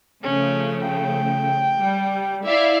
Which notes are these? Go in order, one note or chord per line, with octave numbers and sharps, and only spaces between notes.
C#3 F3 A3 C#4
G5
G3
E4 D5 E5 F5